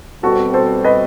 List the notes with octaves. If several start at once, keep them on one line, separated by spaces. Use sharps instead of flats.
B2 G3 C4 F#4 A4
A4 C5
B4 D#5